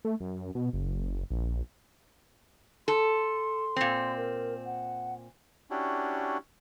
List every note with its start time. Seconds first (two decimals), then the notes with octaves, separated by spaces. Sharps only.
0.05 A3
0.20 F#2
0.55 B2
0.73 F#1
1.31 A#1
2.88 A4 C6
3.76 A#2 C4
4.17 A#4
4.66 F#5
5.70 C#4 D4 E4 F#4 G4